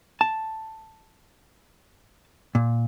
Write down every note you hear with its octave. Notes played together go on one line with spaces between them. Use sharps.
A5
A#2